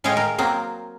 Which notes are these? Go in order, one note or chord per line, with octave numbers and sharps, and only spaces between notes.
A2 G#3 C#5 F5 G5
A#4
F#3 A#3 C4